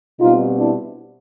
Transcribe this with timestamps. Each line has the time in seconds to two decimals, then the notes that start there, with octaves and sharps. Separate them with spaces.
0.19 B2 G3 C4 D#4 F4
0.59 D4 E4